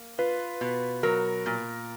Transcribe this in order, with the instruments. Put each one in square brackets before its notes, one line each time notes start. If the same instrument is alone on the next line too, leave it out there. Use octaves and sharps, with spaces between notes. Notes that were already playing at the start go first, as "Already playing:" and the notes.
Already playing: [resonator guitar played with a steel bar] A#3
[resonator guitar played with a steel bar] F4 [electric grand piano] B4
[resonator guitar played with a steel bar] B2
[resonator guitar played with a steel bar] F#3 [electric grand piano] A#4
[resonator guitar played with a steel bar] A#2